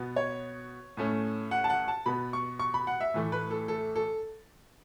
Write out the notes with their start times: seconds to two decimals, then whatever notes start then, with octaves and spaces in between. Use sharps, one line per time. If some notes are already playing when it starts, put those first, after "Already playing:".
Already playing: B2 B3
0.16 C#5
0.97 A2 A3 C#4
1.51 F#5
1.64 A5
1.70 F#5
1.88 A5
2.06 B2 B3 B5
2.33 C#6
2.59 C#6
2.74 B5
2.87 F#5
3.00 E5
3.14 A2 E3 A3
3.32 B4
3.51 A4
3.68 A4
3.95 A4